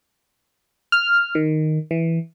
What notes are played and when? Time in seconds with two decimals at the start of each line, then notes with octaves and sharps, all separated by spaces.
0.92 F6
1.35 D#3
1.91 E3